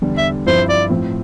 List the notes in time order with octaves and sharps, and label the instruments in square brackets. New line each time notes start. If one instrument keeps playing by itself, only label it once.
[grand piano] E2 D3 G3
[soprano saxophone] E5
[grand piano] G2 F3 C4 E4 [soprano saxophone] C5
[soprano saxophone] D5
[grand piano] A2 F3 C4